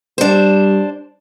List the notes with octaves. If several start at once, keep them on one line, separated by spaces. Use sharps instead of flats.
G3 D4 C5